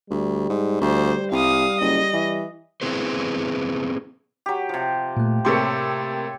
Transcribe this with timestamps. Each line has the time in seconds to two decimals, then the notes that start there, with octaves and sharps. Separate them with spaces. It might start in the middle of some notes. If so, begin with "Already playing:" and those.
0.10 D2 G3
0.49 G#2
0.81 D2 C5
1.32 C2 F5 D#6
1.81 F#1 D#5
2.13 E3
2.81 B3 C4 E4 G#4 B4 C5
4.46 F#3 G4
4.69 C3 F3
5.17 A#2 A3
5.45 A2 C3 A#3 G4 A4 C#5 C6